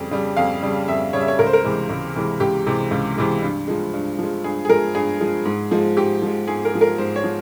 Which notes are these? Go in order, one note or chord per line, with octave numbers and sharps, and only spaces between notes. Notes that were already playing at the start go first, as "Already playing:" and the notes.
Already playing: F2 C#3 G3
C#3 G3
F2 F5
C#3 G3
F2 E5
C#3 G3 C#5
E5
C#5
C#2 A#4
C5
A#4
C3 E3 G#3
C#2
C3 E3 G#3
C#2 G4
C3 E3 G#3
C#2
C3 E3 G#3
G2
F3 G#3
G2
F3 G#3
G2 G#4
G#4
F3 G#3 A#4
G2 G#4
F3 G#3
G#2
F3 G#3
G#2 G4
F3 G#3
G#2 G#4
A#4
F3 G#3
A#4
G#2 C5
C#5
F3